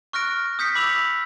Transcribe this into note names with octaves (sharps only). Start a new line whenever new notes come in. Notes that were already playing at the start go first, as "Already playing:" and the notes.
C#6 F6 F#6 A#6 D7
D#6 G6 B6 C#7
B5 D6 E6 F7 F#7